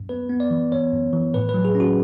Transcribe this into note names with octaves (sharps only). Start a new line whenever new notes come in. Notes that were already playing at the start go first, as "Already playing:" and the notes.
Already playing: F#2
B3 B4
B3
D5
E3
B3 C#5
F#2
E3
A2 B4
B4
F#3
G#4
C#4
F#4